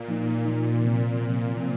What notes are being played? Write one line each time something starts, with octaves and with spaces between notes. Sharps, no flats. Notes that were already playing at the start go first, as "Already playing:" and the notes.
Already playing: A#2
F3 A#3 D#4
A#2 F3 A#3 D#4
C3 F3 C4
C3 F3 C4
C3 F3 C4